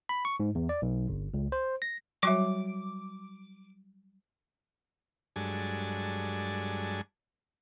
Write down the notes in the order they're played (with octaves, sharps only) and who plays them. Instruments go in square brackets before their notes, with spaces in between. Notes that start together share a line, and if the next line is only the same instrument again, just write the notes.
[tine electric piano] B5
C#6
G#2
E2
D5
B1
G1
C#2
C5
A#6
[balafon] F#3 E5 [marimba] G3 F#4 C#5 [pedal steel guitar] D6
[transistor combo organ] G2 F#3 G#3 D4 A4 G#5